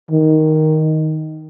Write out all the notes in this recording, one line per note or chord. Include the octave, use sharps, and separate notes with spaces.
D#3